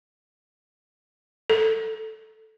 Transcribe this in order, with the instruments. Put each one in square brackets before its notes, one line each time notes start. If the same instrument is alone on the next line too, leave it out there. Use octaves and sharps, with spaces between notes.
[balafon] A4